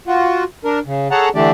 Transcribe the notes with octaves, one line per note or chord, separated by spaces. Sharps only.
F4 F#4
D4 A#4
C#3
G#4 A4 C#5 F#5 A5 A#5
D3 E3 A3 D4 G4 D5